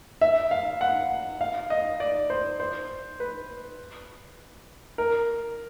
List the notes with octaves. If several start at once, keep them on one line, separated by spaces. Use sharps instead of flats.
E5
F5
F#5
F5
D#5
D5
C5
C5
B4
A#4